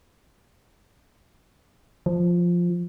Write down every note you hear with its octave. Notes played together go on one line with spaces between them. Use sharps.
F3